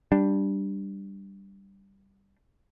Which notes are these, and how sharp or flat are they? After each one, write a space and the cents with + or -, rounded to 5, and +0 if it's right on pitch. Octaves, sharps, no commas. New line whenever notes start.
G3 +0 D4 +0